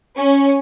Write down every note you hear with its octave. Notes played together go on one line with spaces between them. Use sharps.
C#4